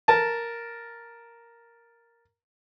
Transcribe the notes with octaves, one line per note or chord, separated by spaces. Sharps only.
A#4 A5